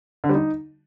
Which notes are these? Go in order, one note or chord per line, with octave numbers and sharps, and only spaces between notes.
D3
G3
D#4